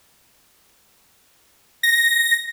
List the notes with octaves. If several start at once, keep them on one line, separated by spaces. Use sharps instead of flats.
A#6